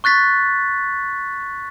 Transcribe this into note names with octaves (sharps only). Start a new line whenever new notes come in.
C#6 F#6 A6 B6